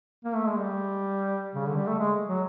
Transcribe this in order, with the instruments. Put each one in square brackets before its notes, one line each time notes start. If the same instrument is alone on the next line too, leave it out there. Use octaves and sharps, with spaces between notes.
[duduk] A#3
A3
G#3
G3
C#3
D3
G3
A3
G#3
F#3